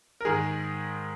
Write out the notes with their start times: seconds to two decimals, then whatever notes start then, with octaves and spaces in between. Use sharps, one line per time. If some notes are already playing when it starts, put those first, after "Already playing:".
0.21 A#4
0.25 G#2 D#3 G#3 G#4